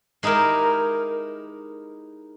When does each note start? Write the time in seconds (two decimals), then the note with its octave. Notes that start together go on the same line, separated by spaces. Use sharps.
0.23 G#3 D#4 E4 G4 A#4